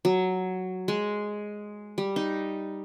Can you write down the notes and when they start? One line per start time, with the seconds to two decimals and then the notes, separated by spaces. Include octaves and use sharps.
0.05 F#3
0.88 G#3
1.98 G3
2.16 D#4